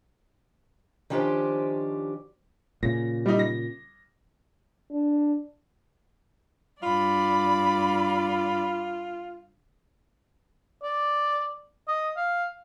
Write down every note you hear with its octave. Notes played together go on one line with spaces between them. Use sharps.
D#3 F3 C#4 D4 G4 C5
A#2 C#3 A#6
G3 D#4
A#6
D4
G2 F4 D5 B5
D5
D#5
F5